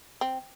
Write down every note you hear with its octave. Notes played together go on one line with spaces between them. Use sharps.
C4